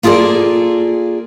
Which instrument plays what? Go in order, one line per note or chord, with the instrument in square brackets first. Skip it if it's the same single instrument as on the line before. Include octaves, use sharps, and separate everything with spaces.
[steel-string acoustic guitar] A#3 F4 G#4 A4 D5